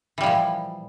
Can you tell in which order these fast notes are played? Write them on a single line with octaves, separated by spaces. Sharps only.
E3 G3 F3 A#2